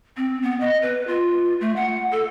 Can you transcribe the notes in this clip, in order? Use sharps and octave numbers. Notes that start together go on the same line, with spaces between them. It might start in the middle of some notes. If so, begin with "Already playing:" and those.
C4
B3
D#5
B4
F4
A3
F#5
A4